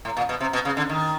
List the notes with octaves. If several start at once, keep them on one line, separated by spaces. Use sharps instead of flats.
A2
A#2
B2
C3
B2
C#3
D3
D#3